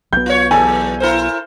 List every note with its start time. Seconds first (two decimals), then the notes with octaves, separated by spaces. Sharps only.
0.13 B1 B3 G6
0.26 F4 C#5
0.51 E2 F#3 A4 G#5
1.00 E4 A#4 C5